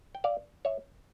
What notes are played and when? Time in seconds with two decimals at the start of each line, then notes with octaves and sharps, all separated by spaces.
0.15 G5
0.24 D5 F5
0.65 C#5 E5